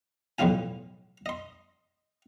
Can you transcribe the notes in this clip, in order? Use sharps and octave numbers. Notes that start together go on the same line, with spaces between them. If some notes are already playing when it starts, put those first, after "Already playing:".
B1 E2 A2 F#3 F4 G#5
D#5 C6